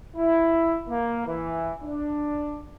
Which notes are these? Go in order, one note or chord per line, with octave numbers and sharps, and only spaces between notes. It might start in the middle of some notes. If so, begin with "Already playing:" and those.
E4
A#3
E3
D4